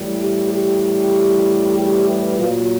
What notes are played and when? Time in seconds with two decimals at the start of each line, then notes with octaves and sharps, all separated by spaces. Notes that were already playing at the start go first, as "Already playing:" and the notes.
Already playing: A2 E3 G3
0.18 G4
0.49 G4
1.75 G4
2.06 B4
2.37 A#2 F#3 F4